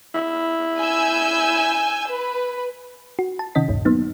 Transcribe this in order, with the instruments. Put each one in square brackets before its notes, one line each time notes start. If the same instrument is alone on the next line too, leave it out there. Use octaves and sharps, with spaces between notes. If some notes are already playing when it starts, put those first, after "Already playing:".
[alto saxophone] E4
[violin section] G#5 E6 G6
B4
[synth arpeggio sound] F#4
A5
C3 D#3 C#4 D#5 B6
A1 D2 G2 A#2
F#3 A#3 B3 D#4